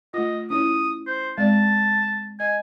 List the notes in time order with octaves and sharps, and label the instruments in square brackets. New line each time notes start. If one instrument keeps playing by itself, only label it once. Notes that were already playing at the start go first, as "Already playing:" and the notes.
[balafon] A3 F4 [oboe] D#5
[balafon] C#4 E4 C#5 [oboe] D#6
[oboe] C5
[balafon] G#3 C4 D5 [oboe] A5
[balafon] D#5 [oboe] G#5